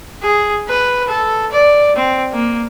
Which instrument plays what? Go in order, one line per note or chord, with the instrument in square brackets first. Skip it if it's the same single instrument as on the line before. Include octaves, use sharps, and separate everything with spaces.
[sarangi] G#4
B4
A4
D5
C4
A#3